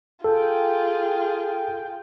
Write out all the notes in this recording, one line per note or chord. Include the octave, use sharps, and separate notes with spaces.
F4 G#4 A4 G5